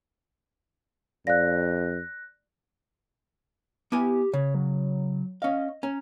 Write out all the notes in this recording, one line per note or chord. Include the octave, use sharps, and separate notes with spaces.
F2 D5 F5 F#6 A#6
B3 E4 G4 G#5
C#3 C#5
F#3
C#4 D#5 F5
C#4 A#5